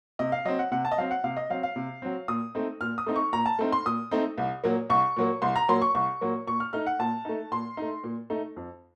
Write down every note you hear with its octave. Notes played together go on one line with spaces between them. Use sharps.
C3 D#5
F5
F#3 C4 D#5
F#5
C3 F#5
A5
D#5
F#3 C4 F5
F#5
C3 F5
D#5
F#3 C4 F5
F5
C3
F#3 C4
A#2 D#6
A3 C4 D#4
A#2 F6
D#6
A3 C4 D#4
C#6
A#2 A#5
A5
A3 C4 D#4
C6
A#2 D#6
A3 C4 D#4
C2
A#2 F#3 A#3
C2 C#6
A#2 F#3 A#3
C2 C6
A#5
A#2 F#3 A#3 C6
C#6
C2 C#6
A#2 F#3 A#3
A#2 C#6
F6
A3 D#4 F6
F#5
A#2 A5
A3 D#4
A#2 C6
A3 D#4
A#2
A3 D#4
F2